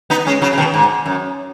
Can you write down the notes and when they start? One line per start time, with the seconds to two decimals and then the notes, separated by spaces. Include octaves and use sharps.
0.10 B3 D#4
0.27 G#3 C#4
0.42 C#3 F#3
0.53 C#3
0.58 B2 D#3
0.74 G#2
1.06 F#2